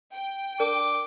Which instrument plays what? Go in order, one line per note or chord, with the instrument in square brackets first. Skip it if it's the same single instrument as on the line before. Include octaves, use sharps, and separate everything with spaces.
[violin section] G5
[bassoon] D4 [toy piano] A#4 [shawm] D6